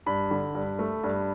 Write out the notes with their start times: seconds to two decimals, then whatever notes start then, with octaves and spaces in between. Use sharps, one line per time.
0.06 G2 B5
0.31 D3
0.55 G2
0.79 A3
1.03 G2